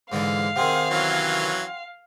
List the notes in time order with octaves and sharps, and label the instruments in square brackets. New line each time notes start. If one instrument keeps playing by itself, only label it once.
[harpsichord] G#2 D3 E3 [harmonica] G#3 [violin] F5
[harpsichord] C3 D#3 [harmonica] G#4 [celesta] F#5 G5 C6
[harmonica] E3 F#3 C#4